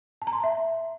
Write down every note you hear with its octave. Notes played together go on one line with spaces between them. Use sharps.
A5
A#5
C6
A5
E5